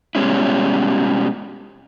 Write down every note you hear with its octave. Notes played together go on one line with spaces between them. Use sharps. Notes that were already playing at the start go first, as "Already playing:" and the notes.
B2 G3 G#3 C#4 E4